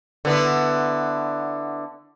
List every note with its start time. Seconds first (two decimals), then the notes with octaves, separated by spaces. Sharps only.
0.25 D3 B3 E4